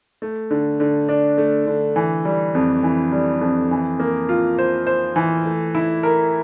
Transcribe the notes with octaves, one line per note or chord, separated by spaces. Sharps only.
A3
D3
D3
D4
A3
D3
E3
G3
F2
E3
G3
F2
E3
A#3
F4
C5
C5
E3
A3
E4
A#4